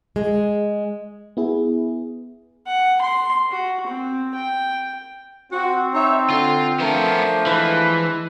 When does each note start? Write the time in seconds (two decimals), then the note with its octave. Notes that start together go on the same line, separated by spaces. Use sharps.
0.16 G#3
1.37 B3 E4 G#4
2.67 F#5
3.02 C6
3.51 F#4
3.87 C4
4.35 G5
5.52 C4 F#4
5.93 D#4 C#5 E5
6.30 D3 F4
6.80 F3 A3 B3 D4 A#4
7.47 E3 G#3 B4